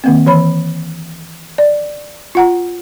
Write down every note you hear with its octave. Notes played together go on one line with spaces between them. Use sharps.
D#3 A#3 C4
E3 C#5 B5
D5
F4 F#5 A#5